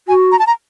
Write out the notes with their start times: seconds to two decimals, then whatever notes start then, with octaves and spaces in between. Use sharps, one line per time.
0.08 F#4 G#5
0.32 A#5
0.39 A5
0.47 A#5